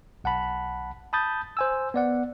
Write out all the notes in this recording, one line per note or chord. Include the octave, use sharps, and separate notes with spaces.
B1 F#5 A5 B5
A5 B5 D#6 G6 A6
C5 G#5 E6
B3 D5 F#5